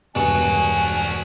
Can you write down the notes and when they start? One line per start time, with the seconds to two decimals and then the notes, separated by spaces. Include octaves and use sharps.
0.15 E1 G2 D4 F#4 G#5 E7